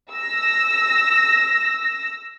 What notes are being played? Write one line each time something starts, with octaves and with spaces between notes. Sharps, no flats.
E6 A#6